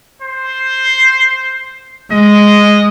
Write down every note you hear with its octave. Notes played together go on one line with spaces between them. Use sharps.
C5
G#3 D#5